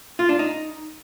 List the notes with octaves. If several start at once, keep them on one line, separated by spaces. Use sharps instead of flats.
F4
D4
D#4